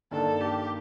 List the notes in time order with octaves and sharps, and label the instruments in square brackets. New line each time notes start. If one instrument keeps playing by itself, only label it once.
[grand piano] G2 D#3 A#3 D4 [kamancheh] A4
[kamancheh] G4